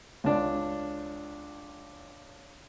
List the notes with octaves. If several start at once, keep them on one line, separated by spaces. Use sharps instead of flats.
C#2 D4